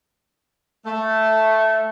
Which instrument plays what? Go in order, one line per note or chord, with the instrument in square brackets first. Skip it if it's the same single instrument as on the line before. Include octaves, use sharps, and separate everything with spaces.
[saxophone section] A3